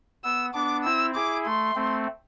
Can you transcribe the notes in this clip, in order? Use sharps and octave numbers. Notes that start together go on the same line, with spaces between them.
B3 E6
B3 D4 D6
C4 E4 E6
E4 G#4 D6
A3 C6
A3 C4